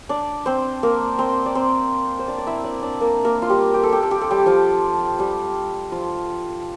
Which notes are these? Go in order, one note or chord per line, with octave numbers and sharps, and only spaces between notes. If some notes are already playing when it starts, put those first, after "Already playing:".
D4 D5
C4 C5
A#3 A#4
C4 C5
D5
C4 C5
C5
D4 D5
D5
E4 E5
D4 D5
D4 D5
A#3 A#4
A#3 A#4
F4
G3 G4
G4
A4
G4
A4
G4
A4
G3 G4
F3 F4
G3 G4
F3 F4